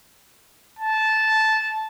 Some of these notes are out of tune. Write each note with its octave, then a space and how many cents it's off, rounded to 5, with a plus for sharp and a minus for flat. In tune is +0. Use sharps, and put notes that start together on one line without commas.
A5 -10